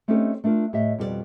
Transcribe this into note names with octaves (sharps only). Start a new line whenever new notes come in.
A3 C4 C#4 D#4 G4 A4
A3 D4 F4 A#4
A2 G4 D#5 E5
F2 B2 G3 F4 D5